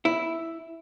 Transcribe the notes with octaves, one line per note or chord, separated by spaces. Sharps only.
E4